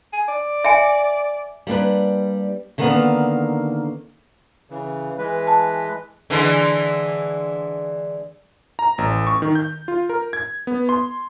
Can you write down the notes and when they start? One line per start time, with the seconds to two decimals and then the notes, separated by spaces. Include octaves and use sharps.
0.13 G#5
0.28 D5
0.64 E5 G5 G#5
1.67 G3 A#3 D4 B4
2.78 D3 D#3 G3 A#3 B3 D4
4.70 C#3 E3
5.18 E3 G#3 B4
5.47 A5
6.30 D3 E3 G#3
8.79 A#5
8.98 A1
9.27 C#6
9.42 D#3
9.55 G6
9.88 F4
10.09 A#4
10.33 G#6
10.67 B3
10.89 C6